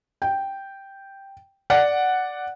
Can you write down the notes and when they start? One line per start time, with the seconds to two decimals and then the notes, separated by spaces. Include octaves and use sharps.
0.22 G5
1.70 D5 F#5